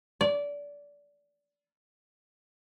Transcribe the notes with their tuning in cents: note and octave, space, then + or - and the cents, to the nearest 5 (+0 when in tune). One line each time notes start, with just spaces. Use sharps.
D5 -20